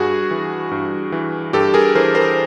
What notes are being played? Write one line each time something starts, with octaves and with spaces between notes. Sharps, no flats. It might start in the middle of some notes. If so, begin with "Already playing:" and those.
Already playing: G2 F#4 G#4
E3
G2
E3
G2 G4 A4
G#4 A#4
E3 A#4 C5
A#4 C5